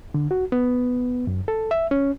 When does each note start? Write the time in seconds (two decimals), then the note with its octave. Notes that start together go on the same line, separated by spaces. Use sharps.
0.14 D3
0.31 F#4
0.52 B3
1.27 F#2
1.48 A4
1.71 E5
1.91 C#4